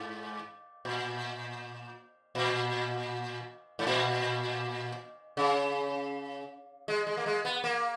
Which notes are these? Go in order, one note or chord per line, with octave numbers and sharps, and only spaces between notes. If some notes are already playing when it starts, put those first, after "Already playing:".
Already playing: G#2
A#2
A#2
G#2
A#2
C#3
G#3
G#3
A#3
G#3
B3
A#3